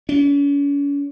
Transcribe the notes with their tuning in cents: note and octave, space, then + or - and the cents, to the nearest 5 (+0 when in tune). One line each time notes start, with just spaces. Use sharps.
C#4 +40